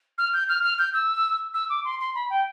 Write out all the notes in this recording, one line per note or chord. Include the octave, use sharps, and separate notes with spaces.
F6
G6
F6
F6
G6
E6
E6
D6
C6
C6
B5
G5